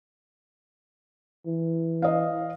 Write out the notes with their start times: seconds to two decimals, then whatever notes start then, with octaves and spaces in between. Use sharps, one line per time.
1.46 E3
2.02 D#5 F5